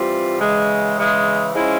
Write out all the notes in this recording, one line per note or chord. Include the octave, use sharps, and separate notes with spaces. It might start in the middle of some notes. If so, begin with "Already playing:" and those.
Already playing: E3 G3 C4 F4
C#3 E3 G#3
C#3 E3 G#3
F3 G#3 C#4 E4